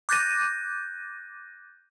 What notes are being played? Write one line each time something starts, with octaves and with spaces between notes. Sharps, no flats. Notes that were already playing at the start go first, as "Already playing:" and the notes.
D6 F#6 G6 A6 A#6 D#7